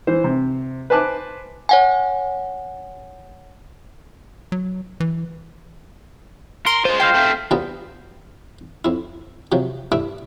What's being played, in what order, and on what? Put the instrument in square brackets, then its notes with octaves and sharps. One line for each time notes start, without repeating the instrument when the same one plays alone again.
[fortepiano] E3 C5
C3
B4 C5 G#5 A5 D6 F#6
[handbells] C#5 F#5 G#5
[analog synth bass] F#3
E3
[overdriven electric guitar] A#4 [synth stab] C6
[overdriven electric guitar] G#3 F4 [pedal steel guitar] C5
[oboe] C5 [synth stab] F5 [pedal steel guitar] G5 C6 F6
[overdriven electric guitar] A3 C4
[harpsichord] D2 G3 B3 F4 A5 A#5
F2 E4
C3 F3 F#3
G2 A3 E4 D6